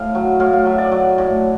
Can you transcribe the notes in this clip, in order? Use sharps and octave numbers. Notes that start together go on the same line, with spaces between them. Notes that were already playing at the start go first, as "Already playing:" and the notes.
Already playing: A2 F5
F#3
A2 F5
F5
F#3 E5
D5
F#3
A2